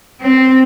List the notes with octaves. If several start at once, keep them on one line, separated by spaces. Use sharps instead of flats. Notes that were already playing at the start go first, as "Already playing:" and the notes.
C4